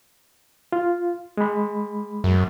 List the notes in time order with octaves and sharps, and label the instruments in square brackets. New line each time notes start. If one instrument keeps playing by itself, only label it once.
[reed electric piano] F4
G#3 B5
[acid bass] F#2